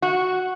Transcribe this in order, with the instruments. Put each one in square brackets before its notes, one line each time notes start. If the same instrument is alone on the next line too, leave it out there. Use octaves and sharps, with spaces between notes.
[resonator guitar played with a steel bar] F#4